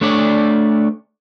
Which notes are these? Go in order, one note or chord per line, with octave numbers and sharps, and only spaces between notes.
A3 D4 C#5 D5